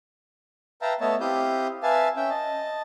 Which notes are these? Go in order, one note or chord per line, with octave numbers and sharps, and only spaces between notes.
B4 E5 F5 G5 A5 A#5
A3 B3 C#5 D#5 E5 A5
C4 E4 G4 F5 D#6 G6
B4 E5 F5 G#5 A5
C#4 E5 G5
D#5 A5